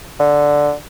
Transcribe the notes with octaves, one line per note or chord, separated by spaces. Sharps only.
D3